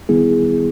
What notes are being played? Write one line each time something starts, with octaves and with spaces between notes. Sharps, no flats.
D#3 G3 B3 E4 G#4